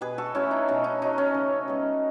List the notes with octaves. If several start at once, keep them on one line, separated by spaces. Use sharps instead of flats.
B2 G#4 B4
F#4 A4
F#3 A3 C#4 E4
D#4
B2 C#4
D#4
F#3 A3 D#4
C#4
C#3
G#3 B3